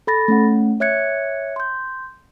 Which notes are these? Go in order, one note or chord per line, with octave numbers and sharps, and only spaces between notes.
A4 B5 A6 A#6
A3 C#4 F#5
C#5 E5 F#6 G#6 C#7
C6 G6